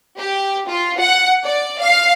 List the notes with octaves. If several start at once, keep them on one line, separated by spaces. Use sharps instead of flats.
G4
F4
F#5
D5
F5